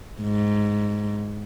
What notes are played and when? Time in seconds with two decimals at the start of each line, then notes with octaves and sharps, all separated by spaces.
0.22 G#2